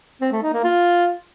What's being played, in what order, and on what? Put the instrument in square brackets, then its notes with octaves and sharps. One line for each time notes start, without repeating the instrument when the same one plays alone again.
[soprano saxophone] C4
A3
D#4
A#3
F4